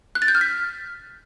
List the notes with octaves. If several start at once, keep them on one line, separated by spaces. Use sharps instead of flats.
F#6
A6
G6
F6
B6